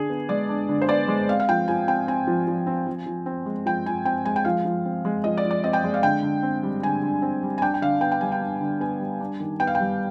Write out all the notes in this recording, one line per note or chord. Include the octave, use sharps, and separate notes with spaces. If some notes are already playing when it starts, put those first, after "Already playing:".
Already playing: D3 D4 G#4
B3
G#3 D5
D4
D3
C5
B3 D5
G#3
C4 F5
F5
F3 G5
F3 G#5
C4 G5
C4 G#5
F3
F3
C4
F3
F3
C4
G#3
F3 G5
F3 G#5
C4 G5
G#3 G#5
G5
F3 F5
F3
C4
G#3
F3 D#5
D5
F3
D5
C4 D#5
G5
G#3
F5
D3 G5
D3
C4
G3
D3 G#5
D3
C4
G3
G#5
D4 G5
G5
D3 F5
B3 G5
G5
G3 G#5
G5
D4
D3
B3 G#5
G3
D4
D#3
B3 G5
F5
G5
G3